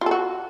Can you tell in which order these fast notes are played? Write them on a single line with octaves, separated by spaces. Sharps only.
F4 A4 F#4